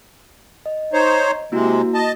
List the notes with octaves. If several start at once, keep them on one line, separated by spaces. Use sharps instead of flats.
D#5
D#4 C5 C#5
C3 G#3 A#3 E4 F#4
D#5 A5